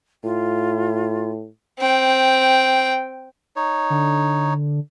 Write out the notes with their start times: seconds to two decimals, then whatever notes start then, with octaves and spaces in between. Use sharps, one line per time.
0.24 A2 F4
1.79 C4 G5
3.56 D#4 C#5
3.90 D3